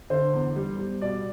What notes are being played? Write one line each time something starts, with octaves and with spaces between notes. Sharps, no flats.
D3 C5
E2
G3
G3
B2 D5